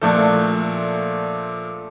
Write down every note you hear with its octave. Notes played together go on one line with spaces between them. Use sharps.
A#2 F3 A3 D4 A4